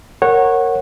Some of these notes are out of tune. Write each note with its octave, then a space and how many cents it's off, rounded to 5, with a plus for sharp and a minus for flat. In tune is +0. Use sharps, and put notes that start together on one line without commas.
A#4 -10 C#5 -20 F#5 +0